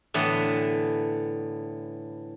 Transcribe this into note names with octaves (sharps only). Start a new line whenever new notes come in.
A2 D3 E3 B3